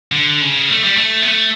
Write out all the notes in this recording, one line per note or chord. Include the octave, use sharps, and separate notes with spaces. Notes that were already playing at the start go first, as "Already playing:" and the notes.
D3
C#3
A3
G3
A3
B3
A3